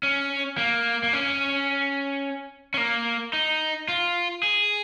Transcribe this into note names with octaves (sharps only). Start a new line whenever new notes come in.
C#4
A#3
A#3
C#4
C#4
A#3
D#4
F4
G#4